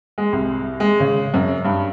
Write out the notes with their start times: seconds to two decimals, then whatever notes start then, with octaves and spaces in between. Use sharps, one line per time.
0.18 G#3
0.33 C2
0.80 G#3
1.00 C#3
1.34 F#2
1.65 G2